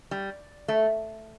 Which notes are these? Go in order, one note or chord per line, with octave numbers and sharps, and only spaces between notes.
G3
A3